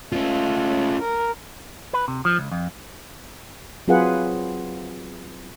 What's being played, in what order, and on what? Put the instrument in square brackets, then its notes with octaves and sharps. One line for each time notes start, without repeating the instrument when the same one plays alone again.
[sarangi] A3 [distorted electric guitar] C#4 F4
[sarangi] A#4
[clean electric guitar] B4
C3
F3
C#2
F2
[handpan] F#3 C4 F4 G#4 B4 F#5